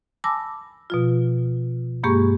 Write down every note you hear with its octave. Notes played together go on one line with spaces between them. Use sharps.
G#5 A5 B5 D6 E6 A#6
B2 F3 F4
G2 G#3 A#3 G4 G#4 C#6